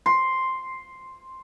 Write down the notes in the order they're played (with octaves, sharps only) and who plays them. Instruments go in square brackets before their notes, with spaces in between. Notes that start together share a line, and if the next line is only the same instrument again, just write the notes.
[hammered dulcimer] C6